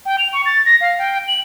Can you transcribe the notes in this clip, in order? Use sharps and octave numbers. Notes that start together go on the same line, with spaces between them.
G5
F7
C#6
A6
A#6
F5
G5
F#7